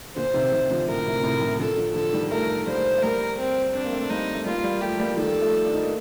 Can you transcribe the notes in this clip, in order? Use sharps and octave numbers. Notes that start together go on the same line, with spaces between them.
A#2 D3 C5
C3 D#3
C3 D#3
D3 F3
A2 A#4
A2 C3
A2 C3
C3 D#3
D3 F3 A4
D3 F3
D3 F3 A4
D#3 G3
F3 A3 A#4
G3 A#3 C5
A3
G3 A#3 A#4
C4
C4 D4
A#3
A3 C4
G3 A#3 D#4
A3
G3 A#3 F4
G3 A#3
F3 A3 G4
G3 A#3
F3
D#3 G3 A4
F3 A3
D4
D#4
A#3 D4